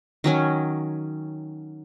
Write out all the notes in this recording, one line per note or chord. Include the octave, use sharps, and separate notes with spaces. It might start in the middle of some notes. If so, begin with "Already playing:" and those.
D#3 F#3 C#4